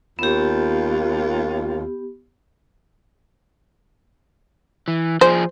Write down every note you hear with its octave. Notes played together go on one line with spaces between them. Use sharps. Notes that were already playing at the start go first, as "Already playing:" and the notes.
D#2 B3 F4 G4
E3
F3 G#4 C5